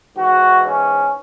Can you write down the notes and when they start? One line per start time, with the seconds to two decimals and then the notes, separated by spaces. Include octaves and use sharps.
0.17 G#2 E3 F#4
0.65 C#4